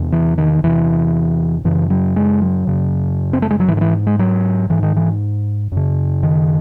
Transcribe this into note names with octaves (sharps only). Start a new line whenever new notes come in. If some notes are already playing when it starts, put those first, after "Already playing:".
Already playing: E2 C3
E3
D#3
E2 C3 E3
F#2 C#3 E3
F#3
G#3
F#3
F#2 C#3
C4
A3
G#3
F#3
G#2 E3
D#3
E3
G#3
F#3
G#2 E3
D#3
E3
F#2 C#3
D#3